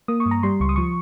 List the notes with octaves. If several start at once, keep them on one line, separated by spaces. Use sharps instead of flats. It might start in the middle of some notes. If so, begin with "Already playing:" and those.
A#3 D#6
C#6
G2
A#5
G3 C6
C#2 C#6
D#6
F3 C#6